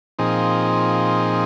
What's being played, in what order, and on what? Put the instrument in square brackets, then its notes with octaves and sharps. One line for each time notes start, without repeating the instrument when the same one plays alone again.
[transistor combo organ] A#2 F3 C4 D#4 G#4